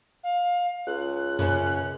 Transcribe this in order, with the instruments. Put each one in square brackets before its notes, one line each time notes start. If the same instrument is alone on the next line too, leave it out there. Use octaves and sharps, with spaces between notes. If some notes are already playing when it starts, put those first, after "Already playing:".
[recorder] F5
[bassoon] C#2 [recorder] F#6
[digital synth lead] F#2 [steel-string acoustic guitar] C#3 C#4